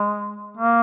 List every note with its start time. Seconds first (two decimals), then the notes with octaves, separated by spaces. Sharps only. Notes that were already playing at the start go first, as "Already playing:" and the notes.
Already playing: G#3
0.57 A#3